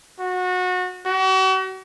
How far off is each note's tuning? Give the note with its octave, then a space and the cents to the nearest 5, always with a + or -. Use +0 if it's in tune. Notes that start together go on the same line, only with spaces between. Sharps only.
F#4 -25
F#4 +40